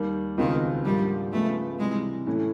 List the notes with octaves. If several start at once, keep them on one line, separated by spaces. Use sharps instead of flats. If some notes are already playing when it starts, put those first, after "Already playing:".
Already playing: D#2 D#3 G3 A#3
C#2 B2 D#3 G#3 C4 F4
G#2 F3 G3 A#3 D4 G4
C#2 C#3 F3 G#3 A3 B3
C3 E3 G3 G#3
A2 E3 A3 C#4